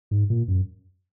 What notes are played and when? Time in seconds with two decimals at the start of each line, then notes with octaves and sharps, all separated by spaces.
0.11 G#2
0.30 A#2
0.48 F#2